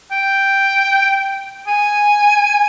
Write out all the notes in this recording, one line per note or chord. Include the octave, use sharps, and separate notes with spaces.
G5
G#5